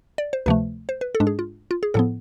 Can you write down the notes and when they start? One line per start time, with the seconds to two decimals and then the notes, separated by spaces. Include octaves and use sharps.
0.18 D5
0.33 C5
0.46 D2 C3 F3 A3 B4
0.89 C5
1.01 B4
1.15 A4
1.20 G#2 G#3 D4
1.27 G#4
1.39 F4
1.71 F4
1.83 G#4
1.94 A2 F3 B3 A4